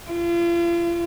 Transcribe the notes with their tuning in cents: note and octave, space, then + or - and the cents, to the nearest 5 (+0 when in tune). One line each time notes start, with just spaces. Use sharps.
F4 -40